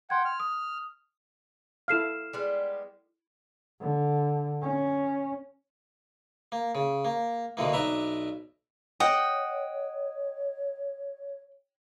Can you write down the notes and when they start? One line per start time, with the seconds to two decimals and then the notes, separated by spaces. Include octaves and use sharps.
0.10 F#5 G5 C6 G#6
0.25 F6
0.40 D#6
1.88 E4 A4 F5 F6 C7 E7
2.33 G3 G#3 B3
3.80 D3
4.62 C#4
6.52 A#3
6.75 C#3
7.05 A#3
7.57 C2 B2 D3 E3 A#3
7.73 B1 D4 B4 E5 A#5
9.00 C#5 D#5 F#5 G5